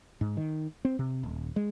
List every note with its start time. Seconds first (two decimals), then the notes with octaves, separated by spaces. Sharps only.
0.21 G#2
0.37 D#3
0.85 C4
0.99 C3
1.23 D#1
1.56 G#3